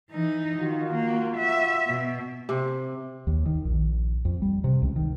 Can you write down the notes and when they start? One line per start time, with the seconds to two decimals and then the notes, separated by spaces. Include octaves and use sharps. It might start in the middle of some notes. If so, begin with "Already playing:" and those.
0.10 E3 D#4
0.60 D#3 F4 F#4
0.94 A#3
1.37 E5
1.87 B2
2.49 C3
3.27 D#2
3.46 D#3
3.65 A#1
4.25 F2
4.42 G3
4.64 C3
4.82 C#2
4.96 D#3